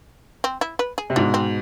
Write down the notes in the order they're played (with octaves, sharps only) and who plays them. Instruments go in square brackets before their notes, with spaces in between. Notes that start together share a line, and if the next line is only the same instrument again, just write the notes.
[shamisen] C4
E4
B4
G#4
[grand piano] C3
[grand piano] G#2 B2 [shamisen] D4
[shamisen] C4